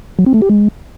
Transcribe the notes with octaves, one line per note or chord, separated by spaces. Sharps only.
F#3
C4
A3
G4
G#3